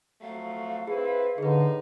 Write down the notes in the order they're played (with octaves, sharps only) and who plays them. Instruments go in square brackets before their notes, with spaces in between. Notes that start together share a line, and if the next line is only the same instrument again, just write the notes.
[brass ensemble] F2 F#3 A3 [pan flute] F5
[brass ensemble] C4 E4 B4 [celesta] G#4
[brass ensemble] A2 D#4 [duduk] D3 [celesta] G#4 B4